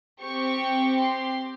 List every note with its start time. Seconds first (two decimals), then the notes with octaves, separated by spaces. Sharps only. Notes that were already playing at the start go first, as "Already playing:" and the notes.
0.22 C4 G4 C#6
0.98 C6